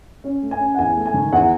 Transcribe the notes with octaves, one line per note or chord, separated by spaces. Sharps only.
C#4
A3
G#5
C#4
F#5
E2 G#5
A3
G#5
D#3
E2 F#5